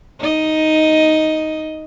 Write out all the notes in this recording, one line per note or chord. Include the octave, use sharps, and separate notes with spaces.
D#4 D#5